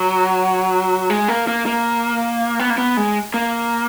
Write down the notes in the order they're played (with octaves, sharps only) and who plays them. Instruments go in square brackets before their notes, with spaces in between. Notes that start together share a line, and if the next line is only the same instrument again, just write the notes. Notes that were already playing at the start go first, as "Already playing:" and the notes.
Already playing: [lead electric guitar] F#3
G#3
A#3
A#3
A#3
B3
A#3
B3
G#3
A#3